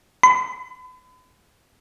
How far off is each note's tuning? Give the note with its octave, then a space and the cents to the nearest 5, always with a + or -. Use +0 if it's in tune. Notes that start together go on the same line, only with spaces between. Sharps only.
B5 +40